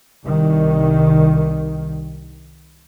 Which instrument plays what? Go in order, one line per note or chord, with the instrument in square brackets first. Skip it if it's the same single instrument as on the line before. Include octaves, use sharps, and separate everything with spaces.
[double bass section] C2 D#3